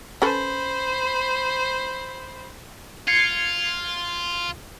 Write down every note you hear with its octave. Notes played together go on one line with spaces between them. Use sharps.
C#4 A4 B4 C5 B5
F4 G#6 C7 C#7